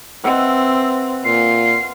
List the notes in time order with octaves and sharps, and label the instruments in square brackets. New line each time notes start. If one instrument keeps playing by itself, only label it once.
[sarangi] C4 [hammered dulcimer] B4 E5 F#5
[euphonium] A#2 [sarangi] F4 [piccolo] C7